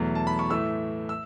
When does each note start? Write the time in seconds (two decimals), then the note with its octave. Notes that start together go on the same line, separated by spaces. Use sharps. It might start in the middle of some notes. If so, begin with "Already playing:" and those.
Already playing: E2 B2 F#3 A3
0.15 A5
0.27 B5
0.39 C#6
0.50 A2 E3 A3 E6
1.09 E6